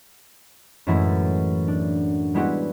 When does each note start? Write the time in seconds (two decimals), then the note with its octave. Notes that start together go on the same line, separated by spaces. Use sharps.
0.87 F#2 A2 E3 G#3 A3 E4
1.68 D4
2.34 G3 G#3 B3 E4 F#4 G4